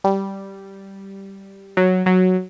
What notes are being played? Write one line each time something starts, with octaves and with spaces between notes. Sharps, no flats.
G3
F#3
F#3